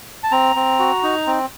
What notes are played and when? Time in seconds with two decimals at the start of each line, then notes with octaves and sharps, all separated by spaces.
0.23 A5
0.32 C4 A#5
0.56 C4
0.79 F#4
1.03 D#4
1.27 C4